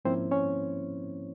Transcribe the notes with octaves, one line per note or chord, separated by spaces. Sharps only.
G#2 F3 A#3 C4 C#4 E4 C5
C#4 C#5